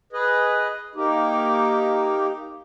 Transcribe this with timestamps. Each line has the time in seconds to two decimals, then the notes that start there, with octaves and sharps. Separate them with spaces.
0.13 G#4 B4 D#5
0.95 A#3 D#4 G4